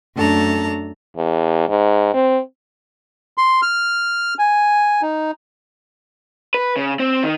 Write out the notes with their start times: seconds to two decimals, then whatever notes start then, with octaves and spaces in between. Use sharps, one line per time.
0.15 F#2 A3 D4 A4 A5 A#5
1.17 E2
1.69 G#2
2.14 C4
3.38 C6
3.62 F6
4.39 G#5
5.02 D#4
6.54 B4
6.77 C#3
7.00 C4
7.24 D#3